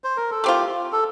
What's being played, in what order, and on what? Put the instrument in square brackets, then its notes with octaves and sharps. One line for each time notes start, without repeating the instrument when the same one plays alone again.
[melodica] C5
A#4
A4
[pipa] A3 C4 F4 [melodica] G4
[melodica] A4